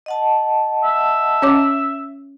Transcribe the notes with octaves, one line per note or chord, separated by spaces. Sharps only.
D#5 F#5 A5
E5
C#4 C#5 D6